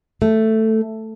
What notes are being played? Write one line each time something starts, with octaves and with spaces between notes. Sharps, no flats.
A3